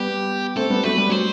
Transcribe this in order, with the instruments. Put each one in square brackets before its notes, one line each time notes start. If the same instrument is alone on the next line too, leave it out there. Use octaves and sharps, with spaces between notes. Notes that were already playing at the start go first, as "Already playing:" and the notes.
Already playing: [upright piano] G3 B3 [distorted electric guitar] G4
[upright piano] A3 C4 [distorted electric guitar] A4
[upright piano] G3 B3
[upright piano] F#3 A3 [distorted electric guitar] B4
[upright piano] G3
[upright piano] F#3 [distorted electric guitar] C5